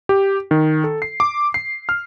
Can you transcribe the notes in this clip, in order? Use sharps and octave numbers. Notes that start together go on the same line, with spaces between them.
G4
D#3
A4
C7
D6
C7
F6